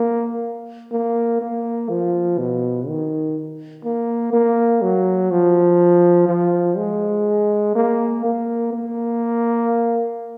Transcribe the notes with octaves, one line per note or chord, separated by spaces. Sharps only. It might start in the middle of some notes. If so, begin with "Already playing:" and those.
Already playing: A#3
A#3
A#3
F3
B2
D#3
A#3
A#3
F#3
F3
F3
G#3
A#3
A#3
A#3